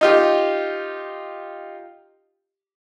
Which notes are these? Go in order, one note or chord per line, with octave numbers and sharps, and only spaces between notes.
D#4 F4 G4